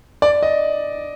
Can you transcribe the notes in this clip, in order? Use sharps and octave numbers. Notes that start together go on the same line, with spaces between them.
D5
D#5